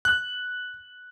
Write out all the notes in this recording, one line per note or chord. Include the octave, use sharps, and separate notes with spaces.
F#6